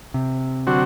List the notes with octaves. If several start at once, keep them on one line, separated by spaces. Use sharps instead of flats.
C3
D3 F#3 C4 F#4